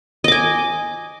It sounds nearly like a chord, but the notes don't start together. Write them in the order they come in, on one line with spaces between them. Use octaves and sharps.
D#5 D6 G#5